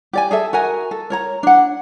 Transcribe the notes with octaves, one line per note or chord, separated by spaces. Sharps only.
G4 D5 G#5
G#4 A4 E5
F#4 A#4 G#5
A4
A#4 C#5 A#5
D4 F#5